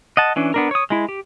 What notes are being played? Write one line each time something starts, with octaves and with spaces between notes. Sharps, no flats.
D#5 F#5 A5
E3 C#4 D4
B3 D4 A#4
C#5 D#6
G#3 E4
G4